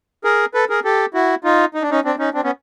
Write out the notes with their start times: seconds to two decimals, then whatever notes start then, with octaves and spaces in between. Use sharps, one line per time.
0.24 G#4 A#4
0.54 A4 B4
0.69 G#4 A#4
0.85 G4 A4
1.14 E4 F#4
1.44 D#4 F4
1.74 D#4
1.82 D4
1.91 C#4 D#4
2.05 C4 D4
2.19 C#4 D#4
2.34 C4 D4
2.44 B3 C#4